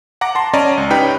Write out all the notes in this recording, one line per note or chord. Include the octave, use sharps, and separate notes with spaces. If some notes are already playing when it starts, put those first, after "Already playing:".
F#5 A#5 D6 A#6
A5 C6
C#4 D5 D#5 A5 A#5
C#2
C#4 D#4 G4 B4 G5 B5